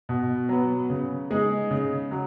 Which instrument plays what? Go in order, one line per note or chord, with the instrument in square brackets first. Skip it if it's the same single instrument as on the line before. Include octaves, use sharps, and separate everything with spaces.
[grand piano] B2
F#3 B3
C#3
G#3 D#4 G#4
C#3
F#3